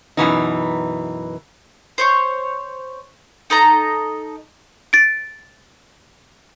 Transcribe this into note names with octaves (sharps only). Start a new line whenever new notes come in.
F#2 B2 E3 D#4
C5 C#5 C#6
D#4 A4 D#5 A#5
A6 D7